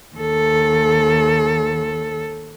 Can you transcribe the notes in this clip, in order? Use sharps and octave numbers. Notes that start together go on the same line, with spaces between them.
D#2 A4